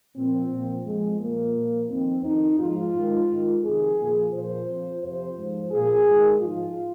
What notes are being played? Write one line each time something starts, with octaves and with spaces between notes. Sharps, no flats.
A#2 F3 C4
A#2 F3
F2 F3 G#3
A#2 F3 A#3
A#2 F3
F2 D#3 C4
F2 D#3 D#4
G#2 F3 F4
G#2 D#3
G#2 D#3
F2 C3 D#3 G#4
A#2 F3
A#2 F3 C5
F2 F3
F2 C3 F3 C5
G#2 F3
A#2 F3 G#4
G#2 D#3
G#2 F3 F4